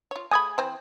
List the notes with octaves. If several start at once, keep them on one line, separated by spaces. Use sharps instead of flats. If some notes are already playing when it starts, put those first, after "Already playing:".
F4 C#5
A3 G#4 G#5 B5 D#6 G#6
E3 C4 C5